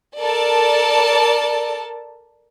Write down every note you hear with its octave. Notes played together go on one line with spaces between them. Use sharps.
A4 A#4 D5 A5